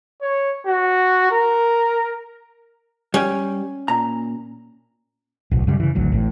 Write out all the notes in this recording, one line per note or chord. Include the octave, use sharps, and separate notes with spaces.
C#5
F#4
A#4
G3 C#4 G4
A#2 A#5
D1 B1
F#2 C#3 G3
C#3 E3
G#1 D2 F#3
A1 A2